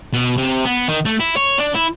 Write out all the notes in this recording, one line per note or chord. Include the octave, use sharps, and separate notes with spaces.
B2
C3
B3
D#3
A3
E4
C#5
D4
E4